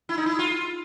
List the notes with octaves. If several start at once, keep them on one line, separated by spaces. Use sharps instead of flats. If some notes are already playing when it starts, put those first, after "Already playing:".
E4
D#4
E4
F4